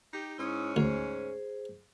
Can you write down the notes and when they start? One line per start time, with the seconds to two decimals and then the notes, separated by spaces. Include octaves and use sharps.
0.13 D#4 G4
0.38 G#2 C#4 E4 D#6 E6
0.76 D2 G#4 C5